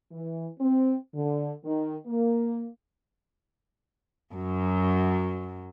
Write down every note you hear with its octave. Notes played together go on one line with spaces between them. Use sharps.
E3
C4
D3
D#3
A#3
F#2 F#3